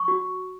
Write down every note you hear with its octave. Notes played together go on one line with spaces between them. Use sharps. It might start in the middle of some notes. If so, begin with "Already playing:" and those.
Already playing: C#6
F#4